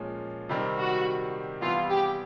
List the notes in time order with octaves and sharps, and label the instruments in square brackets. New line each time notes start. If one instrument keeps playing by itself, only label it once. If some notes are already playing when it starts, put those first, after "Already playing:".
Already playing: [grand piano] A#2 F3 G#3 C#4
C3 D#3 G3 C4
[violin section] F#4
[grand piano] C3 E3 G3 B3 E4 [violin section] F4
[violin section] G4